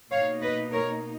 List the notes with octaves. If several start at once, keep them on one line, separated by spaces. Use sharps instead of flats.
B2 A#3 D#4 C#5 F5
B4 D#5
A#4 C#5